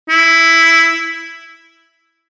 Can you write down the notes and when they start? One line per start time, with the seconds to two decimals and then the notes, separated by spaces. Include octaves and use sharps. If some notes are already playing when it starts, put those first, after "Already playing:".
0.09 E4